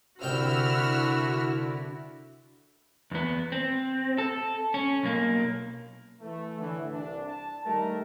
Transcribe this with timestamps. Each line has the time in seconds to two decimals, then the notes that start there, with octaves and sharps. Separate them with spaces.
0.22 C2 D3 E4 F#4 G5 E6 F6
3.11 E2 B3
3.52 C4
4.18 A4
4.74 C#4
5.03 B1 A#3
6.21 E3 A3
6.59 A2 D3 E3
6.91 C2 D4
7.26 A5
7.65 D#3 G3 A3 A#4